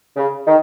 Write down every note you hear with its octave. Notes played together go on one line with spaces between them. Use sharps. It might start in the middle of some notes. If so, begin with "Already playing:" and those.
C#3
D#3